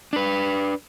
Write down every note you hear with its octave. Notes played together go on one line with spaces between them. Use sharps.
D4 B4